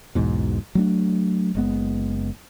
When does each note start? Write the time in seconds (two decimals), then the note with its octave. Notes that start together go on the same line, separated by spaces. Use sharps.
0.15 B1 E2 G#2 B2
0.75 F#3 A3 D4
1.55 F#1 G#3 B3